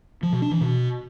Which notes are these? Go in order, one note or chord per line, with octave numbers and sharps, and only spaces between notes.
F3
B2
D4
E3
B2